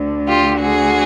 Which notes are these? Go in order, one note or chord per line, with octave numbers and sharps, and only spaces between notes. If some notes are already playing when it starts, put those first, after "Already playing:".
Already playing: D2 D3
F4 G4
F#4 G#4